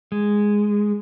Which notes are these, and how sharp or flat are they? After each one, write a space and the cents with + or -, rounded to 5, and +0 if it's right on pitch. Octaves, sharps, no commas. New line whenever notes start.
G#3 -5